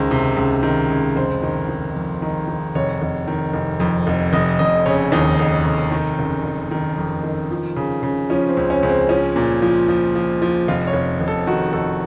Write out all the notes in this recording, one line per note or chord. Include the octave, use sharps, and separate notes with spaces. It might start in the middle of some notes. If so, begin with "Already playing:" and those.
Already playing: C#2 D#3 C5
C3
C#2
D#3
C#2
F1 C5
D#3
D#3
F2
D#3
D#3
F1 C#5
F1
D#3
F1
F2
F1
F1 D#5
F1 D#5
C#3 C#5
D#2 D#4
F1
F1
D#3
F#1
F#1
D#3
F2
D#3
F3
C#3
C#3
F3 C#4
C4
C#2
C#4
C#2
C4
F3 C#4
A#2
F3
F3
F3
F3
F1 F4
C#5
F1
F1
A4
D#3 F#4
F1 A4